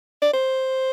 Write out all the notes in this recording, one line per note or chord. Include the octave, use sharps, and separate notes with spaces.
D5
C5